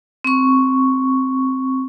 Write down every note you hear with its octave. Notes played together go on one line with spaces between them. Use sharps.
C4 C#6